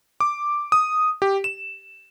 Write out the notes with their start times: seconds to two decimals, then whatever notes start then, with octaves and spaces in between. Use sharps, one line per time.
0.20 D6
0.72 D#6
1.22 G4
1.44 E7